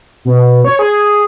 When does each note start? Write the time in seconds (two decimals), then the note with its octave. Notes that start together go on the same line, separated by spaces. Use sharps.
0.25 B2
0.64 C#5
0.79 G#4